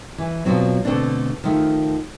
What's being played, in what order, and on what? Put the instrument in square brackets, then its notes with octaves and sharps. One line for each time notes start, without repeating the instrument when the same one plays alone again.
[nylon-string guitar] E3
B2 F3 F#3 C4
B2 D3 A3 C4 D4
D#3 F3 A3